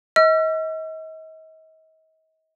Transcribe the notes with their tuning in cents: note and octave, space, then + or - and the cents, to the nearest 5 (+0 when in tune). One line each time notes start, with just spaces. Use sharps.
D#5 +40 E6 +45